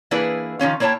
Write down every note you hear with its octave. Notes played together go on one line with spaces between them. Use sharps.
E3 A#3 D4 E4 G#4 B4
D#3 F3 C#4 F5
A#3 E4 C#5 G5 A5